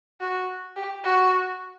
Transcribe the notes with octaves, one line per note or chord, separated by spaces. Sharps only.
F#4
G4
F#4